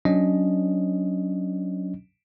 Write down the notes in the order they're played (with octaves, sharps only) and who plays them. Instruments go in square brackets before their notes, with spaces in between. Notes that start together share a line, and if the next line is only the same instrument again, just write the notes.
[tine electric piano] F#3 C#4 D4 D#5